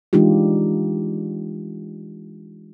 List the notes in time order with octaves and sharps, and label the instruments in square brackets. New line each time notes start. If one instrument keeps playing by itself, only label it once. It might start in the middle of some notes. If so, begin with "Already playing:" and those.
[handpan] E3 G#3 D4 D#4 F4 G4